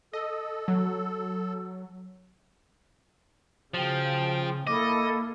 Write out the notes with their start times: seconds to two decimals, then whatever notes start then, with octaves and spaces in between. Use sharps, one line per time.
0.13 A4 D#5
0.68 F#3
3.74 C#3 F3 F#4 G5 F#7 G7
4.67 A#3 E4 A4 D#5 D6